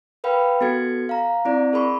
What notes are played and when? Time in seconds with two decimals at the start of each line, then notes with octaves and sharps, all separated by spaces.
0.24 A#4 B4 F5 G5 B5
0.61 B3 F#4 A4 G#6 C#7
1.09 F5 A#5
1.45 C4 E4 D5
1.73 G#4 A#4 B5 C#6